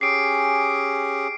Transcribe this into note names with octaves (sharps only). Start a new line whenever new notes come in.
C#4 G4 G#4 C7 D7